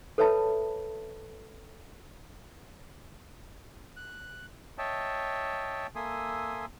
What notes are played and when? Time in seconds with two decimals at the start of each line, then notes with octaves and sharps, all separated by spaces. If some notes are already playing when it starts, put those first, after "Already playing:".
0.18 A4 B4 C#5 E5 A5 B5
3.96 F#6
4.78 C#5 D#5 E5 G5 A5
5.95 A#3 A4 E5 G#5 C6 D#6